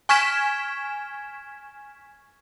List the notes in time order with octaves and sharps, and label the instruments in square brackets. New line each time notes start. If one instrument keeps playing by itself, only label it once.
[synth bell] G#5 C#6 F6 G#6 B6 E7